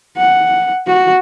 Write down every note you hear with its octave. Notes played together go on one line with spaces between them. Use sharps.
F#5
F#4